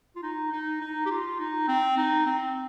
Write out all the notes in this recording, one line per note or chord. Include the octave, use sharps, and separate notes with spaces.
F4
D#4
D#4
D#4
G4
F4
D#4
C4
D#4
C4